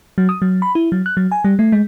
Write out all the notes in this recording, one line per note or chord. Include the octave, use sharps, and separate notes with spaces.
F#3
D#6
F#3
B5
E4
F#3
F#6
F#3
G#5
G3
A3
G#3